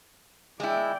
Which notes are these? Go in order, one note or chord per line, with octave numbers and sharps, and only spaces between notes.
G#3 E4 D5 G5